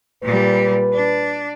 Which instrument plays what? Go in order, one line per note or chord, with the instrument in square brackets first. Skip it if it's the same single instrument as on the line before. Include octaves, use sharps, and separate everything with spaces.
[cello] A#2 G3 [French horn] B4
[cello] D4